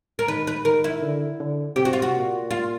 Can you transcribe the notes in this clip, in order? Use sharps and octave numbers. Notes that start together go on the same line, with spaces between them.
A#4
D#3 B4
B4
D#3 A#4
E4
D3
D3
C3 G4
F#4
F4
F#4
A#2
F4